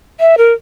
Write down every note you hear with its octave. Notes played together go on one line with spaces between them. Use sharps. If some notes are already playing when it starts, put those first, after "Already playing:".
E5
A#4